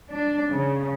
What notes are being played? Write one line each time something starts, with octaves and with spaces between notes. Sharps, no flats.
D4
C#3